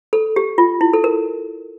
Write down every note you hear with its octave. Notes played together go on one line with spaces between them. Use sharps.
A4
G4
F4
E4
A4
A#4